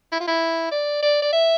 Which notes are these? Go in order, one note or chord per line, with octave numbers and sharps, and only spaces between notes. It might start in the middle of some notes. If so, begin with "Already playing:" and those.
E4
F4
E4
D5
D5
D5
E5